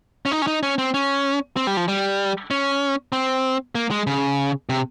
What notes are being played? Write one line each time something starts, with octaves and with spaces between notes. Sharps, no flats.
C#4
D#4
C#4
D#4
C#4
C4
C#4
C4
G3
F3
G3
C#4
C4
A#3
G#3
C#3
C3